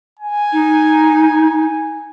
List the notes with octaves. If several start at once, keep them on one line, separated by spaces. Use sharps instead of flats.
G#5
D#4